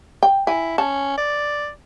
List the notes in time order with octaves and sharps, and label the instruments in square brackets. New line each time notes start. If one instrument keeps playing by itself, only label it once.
[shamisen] G5
[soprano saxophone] E4 [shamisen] G#5
[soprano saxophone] C#4 [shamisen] A5
[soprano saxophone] D5